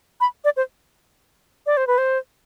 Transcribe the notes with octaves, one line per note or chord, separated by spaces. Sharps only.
B5
D5
C5
D5
C5
B4
C5